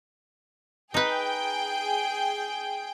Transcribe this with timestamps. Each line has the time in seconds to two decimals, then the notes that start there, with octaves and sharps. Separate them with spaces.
0.94 D#4 G#4 B4 G5